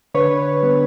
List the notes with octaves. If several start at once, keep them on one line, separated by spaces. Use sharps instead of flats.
D3 B4 C#5
G3 B3